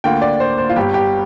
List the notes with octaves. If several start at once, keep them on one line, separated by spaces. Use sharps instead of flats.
D2 D3 A#3 F4 G5
D5
C5
C5
F4
G1 G2 G3 G4
G4